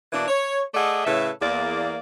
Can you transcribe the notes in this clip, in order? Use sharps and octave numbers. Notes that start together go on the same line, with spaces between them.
B2 E3 A#3 D4
C#5
A3 G#4 A4 D5 D#5 F#5
A2 C#3 A4 B4 C#5 E5
E2 A#3 D5